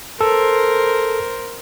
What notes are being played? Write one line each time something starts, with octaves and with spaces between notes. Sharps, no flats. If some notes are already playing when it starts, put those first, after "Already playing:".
A4 A#4 C5